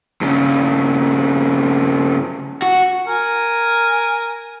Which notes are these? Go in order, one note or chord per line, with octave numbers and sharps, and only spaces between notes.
G2 C#3
F#4
A#4 G#5